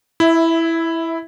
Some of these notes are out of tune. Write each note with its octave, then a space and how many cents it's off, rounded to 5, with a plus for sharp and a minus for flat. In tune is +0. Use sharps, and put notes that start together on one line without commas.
E4 +0 E5 -20